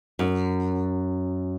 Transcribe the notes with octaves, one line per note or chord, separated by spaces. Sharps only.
F#2